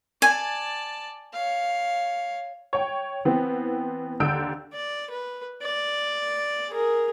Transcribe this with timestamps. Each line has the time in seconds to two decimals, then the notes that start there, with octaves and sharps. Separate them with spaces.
0.22 D5 G#5 A5
1.33 C#5 F5
2.73 C#5 G5
3.25 E3 B3 C4
4.20 D#2 D3 E6 G6 D7
4.73 D5
5.10 B4
5.62 D5
6.70 G#4 A#4